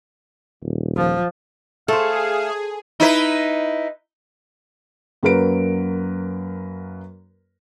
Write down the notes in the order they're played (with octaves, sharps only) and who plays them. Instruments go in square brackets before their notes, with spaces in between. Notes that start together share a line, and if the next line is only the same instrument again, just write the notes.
[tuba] D#1
[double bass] F3
[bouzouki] A3 [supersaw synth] G#4 [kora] A4 C5 [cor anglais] F5
[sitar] D#4 E4 B4
[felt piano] F#2 F#3 A#3 A#4 B4 D7